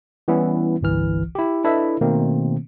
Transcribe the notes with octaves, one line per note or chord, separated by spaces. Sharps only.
E3 G3 B3 C#4 E4
G1 C2 E3 F6
E4 G4
D4 E4 A4 B4 D#5 E5
B2 D#3 A3 A#3 C4